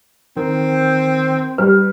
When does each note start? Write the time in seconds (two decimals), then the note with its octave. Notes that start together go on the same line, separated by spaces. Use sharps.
0.37 D#3 C4
1.58 G3 B4